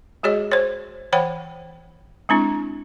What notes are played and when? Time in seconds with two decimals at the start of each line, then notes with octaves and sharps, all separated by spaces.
0.23 G#3 F#4 G#4 C#5 D#5
0.51 C5 C#5
1.12 E3 C5 C#5 F#5 G5 B5
2.29 G#3 C4 D4 E4